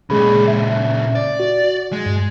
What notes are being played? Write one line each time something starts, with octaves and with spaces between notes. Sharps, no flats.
A#2 C#3 G#3 G#4 B5
E5
D5
F#4
G#3
G2